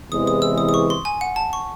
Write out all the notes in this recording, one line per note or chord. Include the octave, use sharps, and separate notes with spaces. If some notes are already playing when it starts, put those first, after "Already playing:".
E2 C3 E3 G#3 D#6
D#6
E6
D#6
D#6
C#6
C6
G#5
F#5
A5
C#6